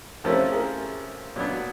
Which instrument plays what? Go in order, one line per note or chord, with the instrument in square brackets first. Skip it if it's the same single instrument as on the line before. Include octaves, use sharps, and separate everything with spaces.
[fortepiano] C3 F3 A3 C#4 E4 [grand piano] A#4 C5
[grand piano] G#4 A#4
[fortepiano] A#2 F#3 B3 D4